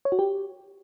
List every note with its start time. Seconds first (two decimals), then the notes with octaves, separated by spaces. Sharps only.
0.05 C#5
0.12 F#4
0.19 G4